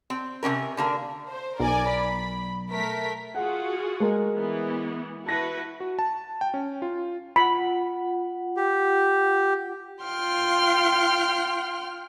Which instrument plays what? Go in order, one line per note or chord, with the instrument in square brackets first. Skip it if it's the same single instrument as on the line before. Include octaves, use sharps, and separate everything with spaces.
[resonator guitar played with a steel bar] C4
C3 F3 C#4 A#4
D3 A#3 A#4
[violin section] C5
[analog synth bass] B1 [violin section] A#4 D5 G#5
[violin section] B5
A3 A#4 B6
[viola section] F4 F#4 G#4 [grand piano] F#5
[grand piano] G#3 A#4
[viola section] E3 B3
[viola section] E4 F#4 B4 [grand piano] A5 A#6
[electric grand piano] F#4
A5
G5
C#4
F4
[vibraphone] F4 F#5 [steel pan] B5
[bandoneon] G4
[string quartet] F4 G5 C6 F6